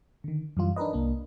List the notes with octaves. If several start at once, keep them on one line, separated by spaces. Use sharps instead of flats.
D3 D#3
F#2 E3 G3 F4
D4 D#4 A#4 B4 D#5
C2 A#3 D4